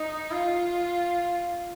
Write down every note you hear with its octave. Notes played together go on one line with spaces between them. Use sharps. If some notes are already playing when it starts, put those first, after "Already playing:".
Already playing: D#4
F4